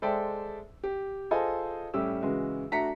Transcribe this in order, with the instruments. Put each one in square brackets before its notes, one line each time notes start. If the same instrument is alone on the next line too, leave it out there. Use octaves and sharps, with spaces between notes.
[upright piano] G#3 A4 C5 D5 E5 G5
G4
F4 G#4 A4 C5 D#5 G#5
A2 G3 C#4 G4 E6
C#3 E3 G#3 F#4
A3 D4 F#4 A#5 B6 C#7